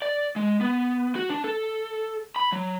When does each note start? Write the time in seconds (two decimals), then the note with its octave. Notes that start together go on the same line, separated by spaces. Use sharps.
0.02 D5
0.36 G#3
0.61 B3
1.16 F#4
1.30 D4
1.44 A4
2.36 B5
2.52 F#3